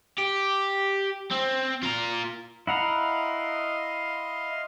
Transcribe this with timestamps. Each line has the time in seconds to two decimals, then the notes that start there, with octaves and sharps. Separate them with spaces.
0.18 G4
1.31 C4
1.83 F4 A#4
2.67 E4 D#5 F5 F#5 A#5 C6